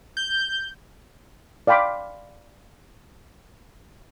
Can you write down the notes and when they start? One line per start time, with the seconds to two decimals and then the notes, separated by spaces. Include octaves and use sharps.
0.17 G6
1.67 D5 F5 G5 B5 C6 D6